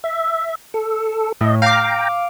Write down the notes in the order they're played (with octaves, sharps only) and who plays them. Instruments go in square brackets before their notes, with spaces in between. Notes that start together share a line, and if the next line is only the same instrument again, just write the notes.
[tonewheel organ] E5
A4
[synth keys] A2 [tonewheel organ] D#5
[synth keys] F5 D6 [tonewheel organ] G5 A#5